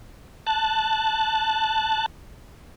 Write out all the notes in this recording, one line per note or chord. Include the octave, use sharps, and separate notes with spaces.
A5 F#6